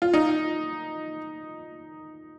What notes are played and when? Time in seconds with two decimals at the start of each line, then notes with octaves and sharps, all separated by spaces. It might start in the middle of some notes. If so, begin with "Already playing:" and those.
0.02 F4
0.14 D#4